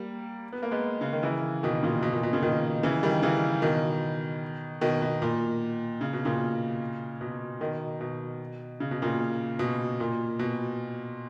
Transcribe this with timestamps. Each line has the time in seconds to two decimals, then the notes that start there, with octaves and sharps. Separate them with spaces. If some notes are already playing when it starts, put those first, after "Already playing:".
Already playing: G3 A#3
0.52 B3
0.63 A#3
0.71 G#3 B3
1.01 C#3
1.13 D#3
1.23 C#3 E3
1.63 B2 D#3
1.83 A#2 C#3
2.03 B2
2.13 A#2
2.23 B2
2.33 A#2 C#3
2.42 B2 D#3
2.83 C#3 E3
3.03 D#3 G3
3.23 C#3 E3
3.62 B2 D#3
4.81 B2 D#3
5.02 B2
5.22 A#2
6.01 C#3
6.13 B2
6.25 A#2 C#3
7.21 B2
7.61 B2 D#3
8.01 B2
8.80 C#3
8.91 B2
9.02 A#2 C#3
9.59 B2
10.00 A#2
10.39 B2